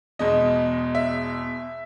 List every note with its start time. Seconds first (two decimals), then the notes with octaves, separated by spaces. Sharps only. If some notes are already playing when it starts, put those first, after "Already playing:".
0.19 E2 B2 G#3 D#5
0.95 E5